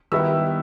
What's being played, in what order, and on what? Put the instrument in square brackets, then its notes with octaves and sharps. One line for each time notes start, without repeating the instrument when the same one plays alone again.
[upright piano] D#3 G3 B3 E4 E6